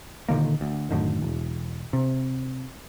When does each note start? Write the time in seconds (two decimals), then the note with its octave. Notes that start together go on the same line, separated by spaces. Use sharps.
0.29 A#2 D3 D#3 A#3
0.61 D2
0.91 F#2 A2 D3 D#3
1.22 E1
1.93 C3